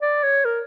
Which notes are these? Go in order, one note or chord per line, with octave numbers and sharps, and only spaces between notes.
D5
C#5
A#4